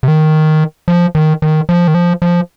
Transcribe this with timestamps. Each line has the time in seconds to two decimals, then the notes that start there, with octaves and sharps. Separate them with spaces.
0.03 C3
0.08 D#3
0.88 F3
1.15 D#3
1.42 D#3
1.69 F3
1.88 D#3
1.94 F3
2.22 F3